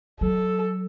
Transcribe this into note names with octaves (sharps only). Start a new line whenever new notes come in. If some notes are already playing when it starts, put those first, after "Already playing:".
F#3 A4